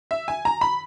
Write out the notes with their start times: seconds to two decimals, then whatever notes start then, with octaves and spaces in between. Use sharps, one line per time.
0.11 E5
0.28 G#5
0.45 A#5
0.61 B5